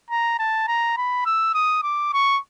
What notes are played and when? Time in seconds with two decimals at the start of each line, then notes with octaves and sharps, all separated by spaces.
0.11 A#5
0.39 A5
0.67 A#5
0.97 B5
1.26 E6
1.54 D#6
1.83 D6
2.13 C#6